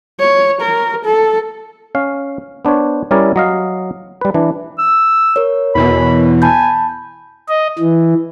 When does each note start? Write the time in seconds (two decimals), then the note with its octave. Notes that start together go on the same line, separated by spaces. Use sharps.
0.20 C#5
0.62 A#4
1.06 A4
1.95 C#4 F5
2.65 B3 D4 C5 C#5
3.11 G3 C#4 E4 A#4 C#5 D5
3.36 F#3 D#5 F5
4.21 G3 B4
4.34 E3 D4
4.79 E6
5.36 A#4 C#5
5.75 E2 B2 E3 B5
6.42 G#5 A5 B5 G6
7.49 D#5
7.79 E3